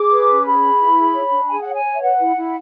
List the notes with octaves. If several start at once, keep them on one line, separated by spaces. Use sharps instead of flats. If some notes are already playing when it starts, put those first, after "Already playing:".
Already playing: G#4 D6
B4
C#4
G#4 B5
B4
E4
G#4
C#5
D4
G#4 G#5
C#5 F#5
G#5
C#5
E5
B4 F#5
E4
E4